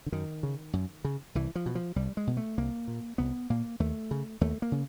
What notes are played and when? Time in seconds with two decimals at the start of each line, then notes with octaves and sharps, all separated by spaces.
0.06 D3
0.12 F#2 D#3
0.43 C#3
0.73 F#2
1.05 C#3
1.35 C2 E3
1.55 F3
1.66 B2
1.75 F3
1.96 C2 G3
2.17 G#3
2.27 B2
2.37 A3
2.57 C2 A#3
2.88 A#2
3.18 C2 B3
3.50 A#2 A#3
3.80 D#2 A3
4.11 C#3
4.41 D#2 A3
4.62 A#3
4.72 C#3